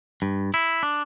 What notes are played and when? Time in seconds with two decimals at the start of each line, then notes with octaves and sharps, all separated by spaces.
0.22 G2
0.54 E4
0.83 D4